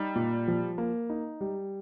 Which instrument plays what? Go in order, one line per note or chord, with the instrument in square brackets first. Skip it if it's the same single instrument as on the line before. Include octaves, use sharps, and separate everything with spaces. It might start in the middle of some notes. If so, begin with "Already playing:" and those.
Already playing: [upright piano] G3 [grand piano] D#4
[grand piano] A#2
F3
A#3
D#4
G3